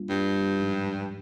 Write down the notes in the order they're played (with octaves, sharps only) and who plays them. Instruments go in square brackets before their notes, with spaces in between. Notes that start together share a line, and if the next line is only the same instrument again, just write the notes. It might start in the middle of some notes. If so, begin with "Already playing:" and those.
Already playing: [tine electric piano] G3 A#3 D4 F4
[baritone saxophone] G2
[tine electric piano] G#2 F3 G#3 D#4